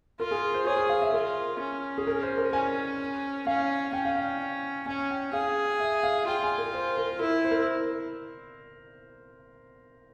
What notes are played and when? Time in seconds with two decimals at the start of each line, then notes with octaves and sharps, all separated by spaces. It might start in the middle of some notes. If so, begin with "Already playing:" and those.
0.20 F4 A#4
0.31 G#4
0.54 C5
0.67 G#4 C#5
0.78 C#5
0.89 F5
1.02 E5
1.12 F4 A#4
1.60 C#4
1.98 G#4
2.07 A#4
2.23 C5
2.38 A#4
2.53 C#4 G#5
3.47 C#4 F5
3.93 C#4 G5
4.05 F5
4.16 G5
4.86 C#4 G#5
5.11 G5
5.33 G#4 F5
5.80 E5
6.03 F5
6.27 F4 G5
6.43 G#5
6.58 A#4
6.73 C5
6.97 A#4
7.20 E4 A#4
7.44 C5
7.51 A#4